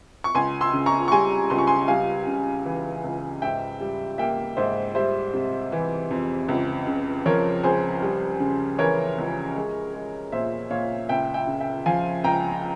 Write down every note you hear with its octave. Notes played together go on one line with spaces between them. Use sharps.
C#6
C#2 G#5 C6
C6 E6
C#3
A#5 C#6
C#6
G3 G#5 C6
C#2 C6
C#6
G#5 C6
G3 F5 G#5
C#3
E3
C#2
G#2 E5 G5
G3
A#3 E5 G5
G#2 C5 E5
G3 C5 E5
C3
E3
F2
C#2
C#3
F3 A#4 C#5
C#2 G#4 C5
G3
C#3
E3 A#4 C#5
C#2
G#3
G#3
A#2 C5 E5
A#2 C#5 F5
C#2 E5 G5
E5 G5
C#3
E5 G5
F3 F5 G#5
C#2 G5 A#5